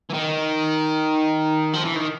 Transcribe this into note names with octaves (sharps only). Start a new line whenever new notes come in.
E3
D#3
F3
E3
D#3